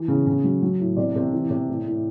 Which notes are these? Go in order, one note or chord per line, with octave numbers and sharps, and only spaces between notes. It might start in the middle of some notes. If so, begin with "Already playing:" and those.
Already playing: E3
C#3
C#3
F#3
F#3
A2
C3 D5
C3
E3
C3
A2
A2